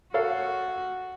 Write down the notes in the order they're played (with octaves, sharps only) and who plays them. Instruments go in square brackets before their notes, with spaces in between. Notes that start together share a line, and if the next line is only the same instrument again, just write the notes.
[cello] F#4 [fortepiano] A4 C#5 F5